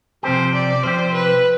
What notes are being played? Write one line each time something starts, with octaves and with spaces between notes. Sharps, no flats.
C3 F3 C4 G4 C5
D5
C3 F3 C4 G4 C5
B4